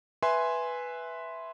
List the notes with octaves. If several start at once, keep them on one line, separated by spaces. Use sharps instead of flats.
B4 E5 G#5 C6